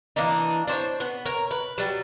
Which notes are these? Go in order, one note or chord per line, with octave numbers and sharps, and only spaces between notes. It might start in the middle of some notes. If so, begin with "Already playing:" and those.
E3 A#3 D4 D#4
D4 C5 C#5
B3
A#4 C#5
B4
F#3 G3